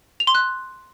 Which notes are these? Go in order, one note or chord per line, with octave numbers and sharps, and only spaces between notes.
F7
C6
F#6